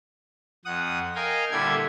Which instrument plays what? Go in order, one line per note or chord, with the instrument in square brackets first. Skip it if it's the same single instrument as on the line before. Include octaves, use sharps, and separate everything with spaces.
[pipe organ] F2 F#5 D#6
A#4 D#5 F5 G5 G#5
A#2 D3 G3 E4 A4 G#6